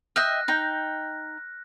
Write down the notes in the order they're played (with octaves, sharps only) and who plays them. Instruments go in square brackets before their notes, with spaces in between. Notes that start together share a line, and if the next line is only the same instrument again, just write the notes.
[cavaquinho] D#5 E5 G5 [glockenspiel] F6 F#6 A#6
[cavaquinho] D#4 G5